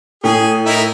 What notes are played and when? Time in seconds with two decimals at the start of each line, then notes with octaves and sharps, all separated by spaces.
0.24 A2 G#4
0.66 D#4 E4 A#4